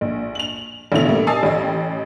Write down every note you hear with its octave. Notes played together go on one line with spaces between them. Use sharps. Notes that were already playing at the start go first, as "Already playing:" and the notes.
A#1
F7 F#7
A1 B2 D3 A3 E4 F7
G3 A3 A#3
G#5 A5 D#6 E6 A6 C7
A1 G4 D#5